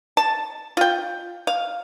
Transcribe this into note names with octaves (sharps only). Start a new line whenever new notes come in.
A5
F4 G5
F5